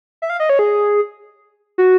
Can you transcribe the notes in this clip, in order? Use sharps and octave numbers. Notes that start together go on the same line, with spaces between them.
E5
F5
D#5
C#5
G#4
F#4